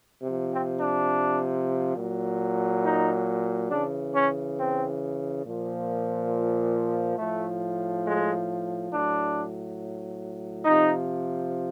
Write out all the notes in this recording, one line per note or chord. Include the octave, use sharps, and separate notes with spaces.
C3 F3
C4
D4
A#2 F#3
D#4
C#3 E3 D4
C#4
C4
A#2 F3
A2 F3 A3
G#3
A2 F#3 D4
C3 F3 D#4